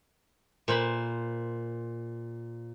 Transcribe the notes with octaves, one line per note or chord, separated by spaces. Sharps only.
A#2 C5 B5